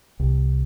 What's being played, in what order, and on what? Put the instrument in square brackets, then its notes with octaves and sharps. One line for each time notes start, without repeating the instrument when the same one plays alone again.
[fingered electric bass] C2